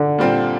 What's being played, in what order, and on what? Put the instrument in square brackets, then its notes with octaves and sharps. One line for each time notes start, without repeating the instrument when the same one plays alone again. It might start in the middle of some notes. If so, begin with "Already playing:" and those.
Already playing: [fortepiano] D3
[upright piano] A#2 G3 C4 F4